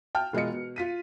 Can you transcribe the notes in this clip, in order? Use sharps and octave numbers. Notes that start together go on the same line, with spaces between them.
G5 A5 F6
E1 G#3 F4 D#5 C#7
B2
F4 B6 D#7